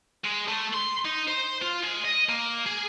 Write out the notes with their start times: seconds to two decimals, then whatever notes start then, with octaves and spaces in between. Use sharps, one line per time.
0.25 G#3
0.48 A3
0.74 C6
1.06 D#4
1.28 C5
1.62 F4
1.83 G#3
2.05 D#5
2.29 A#3
2.67 G#4